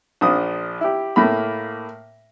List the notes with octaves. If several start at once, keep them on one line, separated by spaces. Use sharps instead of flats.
A#1 F3 F4 D#6
E4 G4
A2 A#3 B5